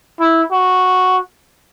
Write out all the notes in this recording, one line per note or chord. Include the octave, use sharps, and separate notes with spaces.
E4
F#4